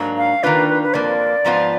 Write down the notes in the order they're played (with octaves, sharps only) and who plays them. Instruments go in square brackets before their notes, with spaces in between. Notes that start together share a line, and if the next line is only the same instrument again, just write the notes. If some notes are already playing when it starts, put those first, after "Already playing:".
Already playing: [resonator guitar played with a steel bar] G#2 F#3 A#3 D4
[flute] F5
[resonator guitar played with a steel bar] D#3 A#3 D4 F4 [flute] B4
[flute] B4
B4
[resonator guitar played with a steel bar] F2 F3 A#3 [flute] D5
[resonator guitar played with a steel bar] G#2 F3 B3 F4